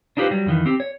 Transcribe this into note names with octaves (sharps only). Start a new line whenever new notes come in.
D4 D#4 F4 G4 B4 C5
F#3 G3
F2 D#3 E3
C4 G4
C#5